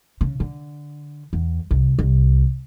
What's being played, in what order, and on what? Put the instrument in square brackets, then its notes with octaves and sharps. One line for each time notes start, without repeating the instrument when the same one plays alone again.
[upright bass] C#3
D3
E2
C2
C2